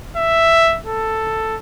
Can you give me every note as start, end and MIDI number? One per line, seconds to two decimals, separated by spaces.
0.17 0.78 76
0.86 1.58 69